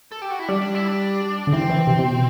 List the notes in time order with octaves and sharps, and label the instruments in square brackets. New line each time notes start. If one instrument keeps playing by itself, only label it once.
[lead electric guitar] A4
G4
F#4
E4
[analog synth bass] G3 [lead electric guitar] D4
[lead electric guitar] D4
E4
D4
[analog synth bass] D3
[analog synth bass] E3 [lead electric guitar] C4
[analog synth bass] E3
C3
C3
B2